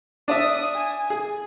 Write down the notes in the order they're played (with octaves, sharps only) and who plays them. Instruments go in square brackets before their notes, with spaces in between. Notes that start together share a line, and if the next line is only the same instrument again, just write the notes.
[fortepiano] D4 D5 E5 [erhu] D#6
[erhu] G#5
[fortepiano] G#4